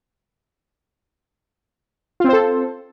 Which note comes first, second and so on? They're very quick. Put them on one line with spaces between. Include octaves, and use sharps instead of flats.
F4 C4 C5 A4